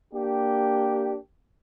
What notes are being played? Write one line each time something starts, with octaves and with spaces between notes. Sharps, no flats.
A#3 D4 G4